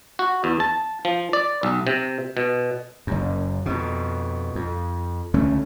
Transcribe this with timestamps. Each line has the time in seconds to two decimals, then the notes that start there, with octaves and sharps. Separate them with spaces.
0.19 F#4
0.44 E2
0.60 A5
1.05 F3
1.33 D5
1.63 B1
1.87 C3
2.37 B2
3.07 F#1 F#2
3.66 F2 B2
4.55 F2
5.34 C#2 D3 A3 C#4